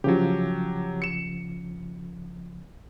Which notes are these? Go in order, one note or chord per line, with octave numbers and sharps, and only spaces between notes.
C#3 F3 F#3 G4
C#7 E7